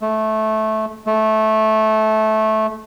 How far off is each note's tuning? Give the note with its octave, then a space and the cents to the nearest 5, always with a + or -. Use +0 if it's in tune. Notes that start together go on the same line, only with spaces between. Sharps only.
A3 -15
A3 -15